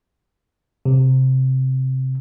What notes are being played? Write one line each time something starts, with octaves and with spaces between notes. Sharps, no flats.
C3